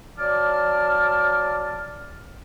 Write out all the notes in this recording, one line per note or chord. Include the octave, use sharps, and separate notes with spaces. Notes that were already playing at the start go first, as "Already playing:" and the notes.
F#3 D5 A5 D6 F6